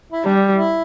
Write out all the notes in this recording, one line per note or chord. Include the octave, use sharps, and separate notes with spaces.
E4
G3 D4
E4